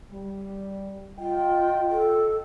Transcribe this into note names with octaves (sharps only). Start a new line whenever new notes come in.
G3
F4 D#5 G5
A4